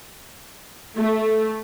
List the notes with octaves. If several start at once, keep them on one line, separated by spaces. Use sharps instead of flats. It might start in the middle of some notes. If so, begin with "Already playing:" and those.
A3